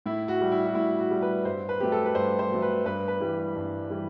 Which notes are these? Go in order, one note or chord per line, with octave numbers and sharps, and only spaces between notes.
A2 E4
F#4
G3
E4
F#4
A2 E4
F#4
G3
B4
G2 C5
B4
F#3 A3 G4
A4
B4
G2 C5
C5
F#3 A3
B4
G2 B4
B4
E3 G3
G2
E3 G3